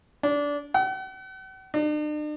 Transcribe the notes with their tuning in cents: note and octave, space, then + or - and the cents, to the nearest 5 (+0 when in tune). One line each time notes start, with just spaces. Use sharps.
D4 -20
F#5 +45
D4 +45